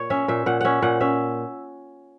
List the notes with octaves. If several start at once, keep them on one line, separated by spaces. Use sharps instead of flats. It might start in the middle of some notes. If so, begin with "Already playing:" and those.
Already playing: A#2 C#5
C#4 E5
A#2 E5
A#2 F#5
C#4 E5 F#5
A#2 F#5
C#4 E5